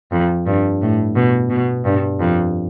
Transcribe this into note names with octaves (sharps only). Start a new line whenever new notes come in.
F2
G2
A2
B2
B2
G2
F2